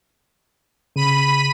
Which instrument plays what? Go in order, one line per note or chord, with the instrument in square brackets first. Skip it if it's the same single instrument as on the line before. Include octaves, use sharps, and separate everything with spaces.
[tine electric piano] C#3 [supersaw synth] B5 D#7